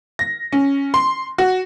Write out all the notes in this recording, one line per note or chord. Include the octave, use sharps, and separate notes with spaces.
A#6
C#4
C6
F#4